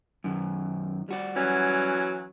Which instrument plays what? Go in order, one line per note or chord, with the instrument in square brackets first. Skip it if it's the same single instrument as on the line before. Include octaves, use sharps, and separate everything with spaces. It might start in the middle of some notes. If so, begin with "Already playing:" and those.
[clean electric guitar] F#2 D#3
G3 F#4 D5
[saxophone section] E3 F#3 C#4